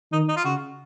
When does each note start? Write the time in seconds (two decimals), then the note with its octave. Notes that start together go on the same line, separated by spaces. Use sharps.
0.12 D#3 D#4
0.28 D#4
0.36 F4
0.45 C#3 F#4